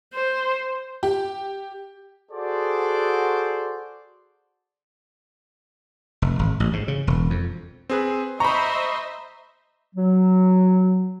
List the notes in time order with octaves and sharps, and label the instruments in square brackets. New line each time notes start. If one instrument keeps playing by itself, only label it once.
[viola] C5
[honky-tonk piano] G4
[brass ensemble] F#4 G#4 A4 C5 D5
[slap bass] F1
G#1
A1
G#2
C#3
E1
F2
[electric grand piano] C4 G#4 B4
[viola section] C5 D#5 E5 [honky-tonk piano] A#5 B5 [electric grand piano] C#6
[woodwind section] F#3